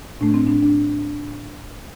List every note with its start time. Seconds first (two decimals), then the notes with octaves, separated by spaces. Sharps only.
0.21 A2 A3 D4
0.34 C4
0.47 D4
0.62 D4